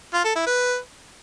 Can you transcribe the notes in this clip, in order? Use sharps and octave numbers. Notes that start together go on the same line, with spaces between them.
F4
A4
E4
B4